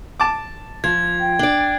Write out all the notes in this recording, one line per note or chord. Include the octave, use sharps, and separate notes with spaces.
A5 D6
F3 G#6
G5
D4 D5